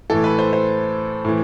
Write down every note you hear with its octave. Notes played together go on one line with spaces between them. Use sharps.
A2 E3 A4
B4
C5
C5
A2 E3